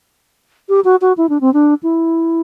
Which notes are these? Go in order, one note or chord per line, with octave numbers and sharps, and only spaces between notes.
G4
F#4
F#4
E4
D4
C4
D4
E4